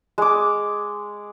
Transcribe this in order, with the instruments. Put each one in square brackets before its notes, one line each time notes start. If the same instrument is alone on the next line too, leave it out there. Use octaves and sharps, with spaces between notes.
[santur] G#3 D6